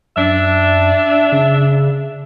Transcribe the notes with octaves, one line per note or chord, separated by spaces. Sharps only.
F#2 D4 E5
C#3